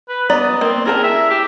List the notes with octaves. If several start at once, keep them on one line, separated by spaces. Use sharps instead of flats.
B4
B3 D5 D#5 A#5
A#3 C4
E4 G#4 A#4 A5
E5
G4